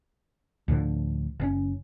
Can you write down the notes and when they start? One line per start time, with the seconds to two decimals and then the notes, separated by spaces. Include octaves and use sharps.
0.68 D2 A2 D3 F3
1.40 F#1 A2 C#4